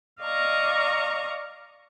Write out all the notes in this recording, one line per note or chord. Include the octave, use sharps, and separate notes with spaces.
D5 D#5 F5 A#5 C#6